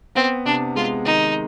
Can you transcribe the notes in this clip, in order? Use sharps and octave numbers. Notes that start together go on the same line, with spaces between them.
B3 C4
C3 D4
G#3 F4
D#3 D#4